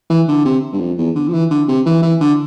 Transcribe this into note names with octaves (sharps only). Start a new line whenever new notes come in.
E3
D3
C3
G2
F2
E2
D3
F3
E3
D3
C3
E3
E3
D3